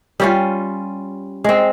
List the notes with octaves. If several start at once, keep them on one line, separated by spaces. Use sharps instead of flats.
G3 C#4 F4
G#3 C4